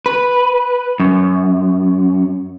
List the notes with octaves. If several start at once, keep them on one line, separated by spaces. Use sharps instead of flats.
B4
F#2